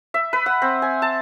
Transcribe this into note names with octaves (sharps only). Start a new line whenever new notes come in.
E5
B4
F#5
C4
G#5
A5